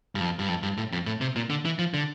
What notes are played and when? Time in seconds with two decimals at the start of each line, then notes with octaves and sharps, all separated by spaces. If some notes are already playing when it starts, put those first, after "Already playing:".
0.15 G2
0.20 F2
0.39 G2
0.49 F2
0.63 G2
0.78 A2
0.92 F2
1.06 A2
1.21 C3
1.36 A#2
1.50 D3
1.65 E3
1.79 F3
1.94 D3